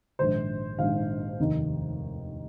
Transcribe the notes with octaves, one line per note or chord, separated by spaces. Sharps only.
A#1 G#2 D#3 C5
A#1 G#2 D#3 F5
F1 D#2 D#3